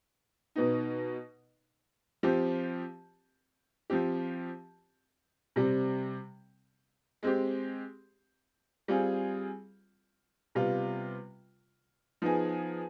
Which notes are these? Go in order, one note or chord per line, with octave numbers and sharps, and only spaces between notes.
B2 B3 D#4
F3 C4 G4
F3 C4 G4
C3 G3 C4
G#3 C4 G4
G3 C4 F4 G#4
C3 G3 B3 F4
F3 B3 D#4 G#4